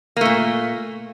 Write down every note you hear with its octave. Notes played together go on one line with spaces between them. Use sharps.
A#2 A3 A#3